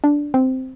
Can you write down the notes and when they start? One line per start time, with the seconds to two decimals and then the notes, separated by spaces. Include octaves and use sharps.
0.04 D4
0.34 C4